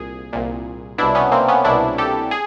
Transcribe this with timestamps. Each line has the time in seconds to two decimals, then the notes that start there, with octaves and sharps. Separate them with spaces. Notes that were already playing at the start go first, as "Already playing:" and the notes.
Already playing: C2 A#2 G#4
0.33 C2 A#2
0.98 C2 B2 D4 E4
1.15 B3 C#4
1.32 A#3 C4
1.48 B3 C#4
1.64 C2 B2 D4 E4
1.98 G4 A4
2.31 G#4